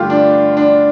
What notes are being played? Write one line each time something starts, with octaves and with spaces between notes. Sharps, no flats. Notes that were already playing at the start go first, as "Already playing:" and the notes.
Already playing: G2 D3 F3 A3 F4 G4
D4
D4